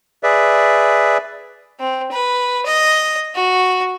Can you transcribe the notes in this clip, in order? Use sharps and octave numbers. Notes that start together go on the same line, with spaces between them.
G#4 B4 D5 E5
C4
B4
D#5
F#4